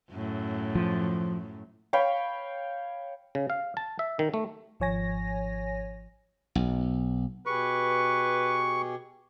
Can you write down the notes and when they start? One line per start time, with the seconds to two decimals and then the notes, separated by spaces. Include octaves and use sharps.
0.11 F#2 A2
0.75 F3
1.93 C#5 F5 G5 B5
3.35 C#3
3.50 F5
3.77 A5
3.99 E5
4.19 D#3
4.34 A3
4.80 G#1 F3 C#5 G#5 A#6
6.55 B1
7.46 B2 G4 G#4 B4 C#6